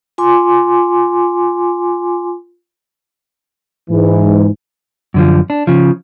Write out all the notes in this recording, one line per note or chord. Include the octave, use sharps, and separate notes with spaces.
F4 G#5 C6 D6
G#2 E3
F#2 D3 F3
D4
C#3 F3